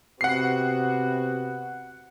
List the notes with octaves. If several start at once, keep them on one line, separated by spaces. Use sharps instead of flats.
C3 B3 F#4 F#5 C7